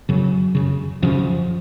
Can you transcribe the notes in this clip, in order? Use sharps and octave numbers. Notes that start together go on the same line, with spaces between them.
F#2 C#3 F#3
F#2 C#3
F#2 C#3 F3